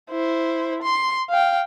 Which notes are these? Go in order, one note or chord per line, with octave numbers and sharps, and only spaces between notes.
E4 C5
C6
F5 G5